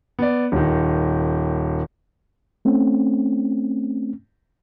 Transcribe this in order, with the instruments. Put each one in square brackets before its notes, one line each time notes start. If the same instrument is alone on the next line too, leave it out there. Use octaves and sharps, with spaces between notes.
[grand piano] B3 D5
D#1 D#3
[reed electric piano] A3 C4 C#4